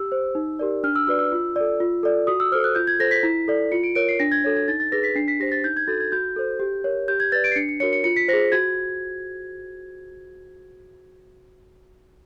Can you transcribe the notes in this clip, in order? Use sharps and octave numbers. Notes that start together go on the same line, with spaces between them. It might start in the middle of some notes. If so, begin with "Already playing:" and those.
Already playing: G4 E6
C5
D#4
G4 A#4 D5
D4 F6
E6
F#4 B4 D5 E6
E6
F4
A4 D5
F4
A4 D5
F#4 D#6
E6
A4 C5 F6
F#6
F4 G6
G#6
A4 C5 A#6
B6
E4
A4 D5
F4 C#7
D7
A#4 C#5 D7
C7
D4 A#6
G#6
F#4 A4 C#5
G#6
D#4 A6
A6
G#4 B4 A#6
B6
D4 C7
B6
G4 C5 A#6
A6
D#4 G6
G#6
F#4 A4 A6
G#6
F#4 G6
A4 C5
G4
A#4 C#5
G4 G6
G#6
B4 D5 A6
D7
C7
D4 C#7
C#7
F#4 A#4 C#5 C#7
C#7
F4 C#7
B6
G#4 C5 A#6
F#4 G#6